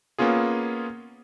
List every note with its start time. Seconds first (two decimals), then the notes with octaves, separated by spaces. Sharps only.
0.18 A#3 B3 C#4 F4 G#4